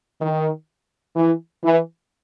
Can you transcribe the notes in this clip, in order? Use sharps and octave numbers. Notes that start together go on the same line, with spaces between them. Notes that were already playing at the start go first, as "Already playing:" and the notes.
D#3
E3
E3